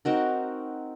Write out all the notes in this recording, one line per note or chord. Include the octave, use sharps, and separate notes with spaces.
C4 D#4 F#4 A#4